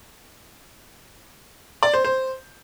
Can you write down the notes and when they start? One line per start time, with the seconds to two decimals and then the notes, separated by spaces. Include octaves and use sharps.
1.83 D5
1.94 C5
2.05 C5